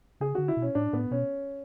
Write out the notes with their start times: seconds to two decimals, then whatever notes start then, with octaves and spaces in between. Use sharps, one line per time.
0.20 C#3 G#4
0.35 D3 F#4
0.48 E4
0.57 B2
0.62 C#4
0.75 A2 D4
0.93 A2 B3
1.11 B2 C#4